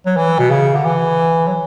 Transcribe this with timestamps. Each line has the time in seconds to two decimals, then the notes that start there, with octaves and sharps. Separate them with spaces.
0.06 F#3
0.17 E3
0.39 B2
0.51 C#3
0.75 D3
0.85 E3
1.48 F#3